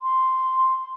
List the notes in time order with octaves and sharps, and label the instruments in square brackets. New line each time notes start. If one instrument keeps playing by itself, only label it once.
[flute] C6